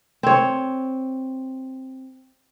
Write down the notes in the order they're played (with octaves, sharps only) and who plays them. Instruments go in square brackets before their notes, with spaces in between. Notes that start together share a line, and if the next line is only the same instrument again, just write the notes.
[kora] C4 C#5